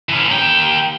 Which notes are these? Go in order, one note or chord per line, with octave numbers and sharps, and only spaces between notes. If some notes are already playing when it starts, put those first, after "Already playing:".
E3 C#4
D#2 G5